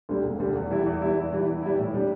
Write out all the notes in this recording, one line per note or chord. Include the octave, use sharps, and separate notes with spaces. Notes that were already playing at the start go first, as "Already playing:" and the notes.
D2 D3 G3
E1
D2 D3 G3
E2
E3 G3 E4
E2
E3 G3 E4
E2
E3 G3 E4
E2
E3 G3 E4
A2
G3 D4